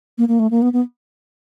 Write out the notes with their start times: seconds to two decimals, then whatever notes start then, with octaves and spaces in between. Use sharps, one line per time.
0.18 A#3
0.28 A#3
0.39 A3
0.51 A#3
0.62 B3
0.73 B3